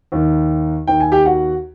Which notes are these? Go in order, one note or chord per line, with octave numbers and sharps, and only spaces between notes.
D#2 D#3
D#2 D#3 G5
G#5
G4 G5
F#4 F#5